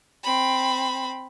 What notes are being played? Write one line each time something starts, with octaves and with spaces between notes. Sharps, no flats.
C4 B5